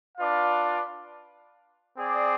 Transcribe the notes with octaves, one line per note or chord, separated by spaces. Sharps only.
D4 F4 B4 D5 F5
C4 G#4 D5